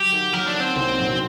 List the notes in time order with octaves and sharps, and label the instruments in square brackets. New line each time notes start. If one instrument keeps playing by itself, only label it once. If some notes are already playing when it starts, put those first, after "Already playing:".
Already playing: [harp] F#3 [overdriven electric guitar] G4
[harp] A#3 D#4
[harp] F#3 [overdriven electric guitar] A#4
[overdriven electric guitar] D4
[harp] A#3 D#4
[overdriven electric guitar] C4
[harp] C2
A#2 F#3 A#3 D4